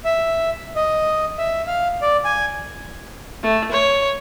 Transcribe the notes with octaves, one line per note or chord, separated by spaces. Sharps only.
E5
D#5
E5
F5
D5
G#5
A3
C#5